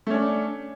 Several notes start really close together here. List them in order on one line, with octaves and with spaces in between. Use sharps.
A3 C#4 D4